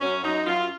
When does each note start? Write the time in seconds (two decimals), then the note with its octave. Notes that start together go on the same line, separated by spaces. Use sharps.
0.01 F#2 C#4
0.23 F#2 D#4
0.46 F#2 F4